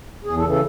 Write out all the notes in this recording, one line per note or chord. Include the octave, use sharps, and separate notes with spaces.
E2 G#4
A4
C#3 E3
A4